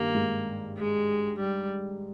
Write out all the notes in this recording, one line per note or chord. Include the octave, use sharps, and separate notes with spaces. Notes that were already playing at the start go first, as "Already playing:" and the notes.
Already playing: G2 D#3 G3 A#3
G#2 G#3
G#3
G3